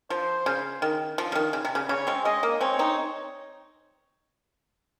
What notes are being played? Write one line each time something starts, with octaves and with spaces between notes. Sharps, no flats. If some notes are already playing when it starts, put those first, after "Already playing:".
F3 C5
C#3
D#3
F3
C#3
D#3
C#3
C3
C#3
C#3 C#5
G#3 C4
G#3 D#5
A#3
G#3 C4 C#5
C4 D#4